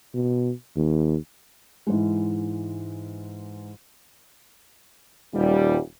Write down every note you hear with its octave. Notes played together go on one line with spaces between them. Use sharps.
B2
D#2
G#2 E3 G#3
D#1 G3